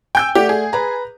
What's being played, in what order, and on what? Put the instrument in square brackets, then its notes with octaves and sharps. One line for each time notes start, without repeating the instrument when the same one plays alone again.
[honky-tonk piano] G5 G6 [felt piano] G#5 E6
[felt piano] A3 D5 F#5 [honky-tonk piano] G4
[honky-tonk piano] G#4
[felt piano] B4 A#5